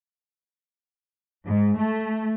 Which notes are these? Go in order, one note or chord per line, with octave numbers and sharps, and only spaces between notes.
G#2
A3